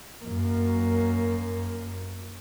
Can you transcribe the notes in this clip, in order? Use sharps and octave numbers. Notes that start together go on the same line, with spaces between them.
F#2 A#3